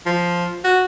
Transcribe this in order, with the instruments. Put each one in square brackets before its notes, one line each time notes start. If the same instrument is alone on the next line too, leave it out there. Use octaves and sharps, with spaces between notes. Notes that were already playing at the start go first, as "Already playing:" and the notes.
[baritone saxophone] F3
F#4